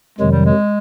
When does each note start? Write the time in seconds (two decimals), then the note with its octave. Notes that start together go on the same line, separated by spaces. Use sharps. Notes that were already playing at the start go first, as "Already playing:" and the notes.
0.19 F2 C3 D#3 F#3 G#3
0.32 G3
0.46 G#3